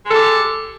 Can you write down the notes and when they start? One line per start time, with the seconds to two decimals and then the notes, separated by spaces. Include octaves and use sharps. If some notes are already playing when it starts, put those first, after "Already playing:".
0.06 G#3
0.11 A4
0.15 G4